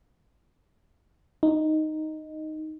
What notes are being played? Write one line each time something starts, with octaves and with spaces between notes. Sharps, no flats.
D#4